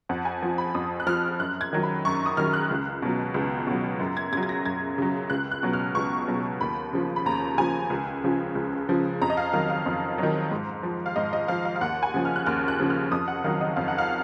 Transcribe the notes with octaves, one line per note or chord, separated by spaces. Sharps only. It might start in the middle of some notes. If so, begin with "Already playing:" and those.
F2 F#5
G#5
F3
B5
F2 D#6
F#6
F3 F6
F#2 F#6
G#6
D#3 F#3
B5
F#2 C#6
D#6
D#3 F#3 F6
F#6
C#2
B2 F#3
C#2
B2 F#3
F#2
G#6
C#3 F#3 G#6
G#6
A#6
F#2 G#6
C#3 F#3
C#2 F#6
F#6
B2 F#3
F6
C#2 C#6
B2 F#3
D#2 B5
C#3 F3
B5
D#2 A#5
C#3 F3 G#5
C#2
C#3 F3
C#2
C#3 F3
F2 A#5
D#5
F5
D#3 F#3 F5
F5
F2
D#3 F#3
G#2
F3
F5
G#2 D#5
D#5
F3 F5
F5
F5
D#2 F#5
G#5
C#3 F3
F6
F#6
D#2 F6
F#6
C#3 F3
F6
F2 D#6
F#5
D#3 F#3 F5
D#5
F2 F5
F#5
F5